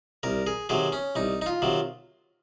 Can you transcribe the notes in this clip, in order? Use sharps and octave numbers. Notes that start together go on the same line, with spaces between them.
C2 A#4
G#4
C3 D#3 F#3 G#4
C#4
C2 D#4
D#4
F4
C3 D#3 F#3